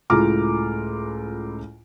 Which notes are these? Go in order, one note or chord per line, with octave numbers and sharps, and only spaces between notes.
C#2 A2 F4 A#5 D6 F6